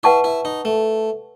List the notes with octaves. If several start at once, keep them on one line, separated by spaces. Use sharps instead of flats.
E4 B4 F#5 A5 C#6
E4
D#4
A3